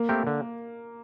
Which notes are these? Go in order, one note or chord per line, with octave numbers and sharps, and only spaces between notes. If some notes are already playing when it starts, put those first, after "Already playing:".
Already playing: A#3
A3 C4 G4 A#4
D3